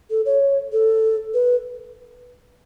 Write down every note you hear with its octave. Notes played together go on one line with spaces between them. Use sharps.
A4
C#5
A4
B4